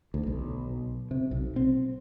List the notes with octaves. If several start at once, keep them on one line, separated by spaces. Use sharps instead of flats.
D2
B1
C3
B1
C4